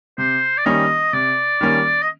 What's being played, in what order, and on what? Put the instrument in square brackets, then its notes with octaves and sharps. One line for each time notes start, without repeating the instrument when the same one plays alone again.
[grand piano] C3 [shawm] C5
[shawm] D5
[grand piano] D#3 G3 A#3 C#4 [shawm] D#5
[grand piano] C3 [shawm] D5
[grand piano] D#3 G3 A#3 C#4
[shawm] D#5